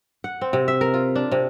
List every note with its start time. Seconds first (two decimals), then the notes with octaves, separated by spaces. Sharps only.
0.24 F#5
0.41 C4
0.53 C3
0.68 E5
0.81 A#4
0.94 F4
1.16 D4
1.32 C3